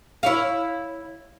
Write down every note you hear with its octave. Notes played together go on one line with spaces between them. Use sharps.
E4 C#5 F5